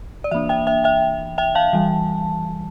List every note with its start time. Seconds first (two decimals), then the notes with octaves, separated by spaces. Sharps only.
0.24 D5
0.31 E3 A#3 D4 E5
0.49 E5 G5
0.67 E5 G5
0.84 E5 G5
1.38 E5 G5
1.55 F5 A5
1.73 E3 G3